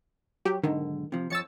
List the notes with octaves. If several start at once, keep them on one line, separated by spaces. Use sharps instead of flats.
F#3 G4
B1 G#2 D3 D#3
C3 F3
F2 F3 C#5 E6 A6 C#7